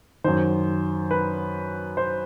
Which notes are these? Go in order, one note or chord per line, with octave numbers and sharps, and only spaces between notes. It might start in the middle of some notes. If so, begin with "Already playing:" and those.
F#2 D#3 C5
B4
C5